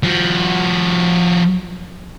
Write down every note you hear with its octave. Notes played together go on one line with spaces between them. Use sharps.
F3 F#4